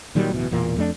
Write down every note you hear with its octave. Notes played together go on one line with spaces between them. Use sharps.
A#2 D#3 F#3 G3
D1 B2 E3
E1 E2 A#2 A#3
F2 A3 D4